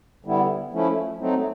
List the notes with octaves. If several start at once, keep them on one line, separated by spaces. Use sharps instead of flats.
D3 G3 B3 E4
F3 A3 C#4 E4
F#3 A3 C4 D#4